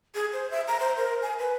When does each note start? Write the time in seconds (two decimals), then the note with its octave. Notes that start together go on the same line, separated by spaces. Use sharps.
0.15 G#4
0.33 C5
0.51 E5
0.68 A#5
0.80 C5
0.97 A#4
1.22 G#5
1.39 B4